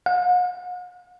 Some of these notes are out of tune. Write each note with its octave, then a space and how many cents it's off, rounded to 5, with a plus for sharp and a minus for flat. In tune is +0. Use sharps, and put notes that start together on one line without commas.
F#5 -45